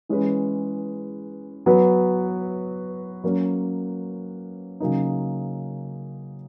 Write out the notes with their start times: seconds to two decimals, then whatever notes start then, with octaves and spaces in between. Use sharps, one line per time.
0.09 E3 G#3 C#4 G#4 B4
1.66 F#3 B3 F#4 B4
3.24 F#3 A#3 C#4
4.80 C#3 F#3 A#3 D#4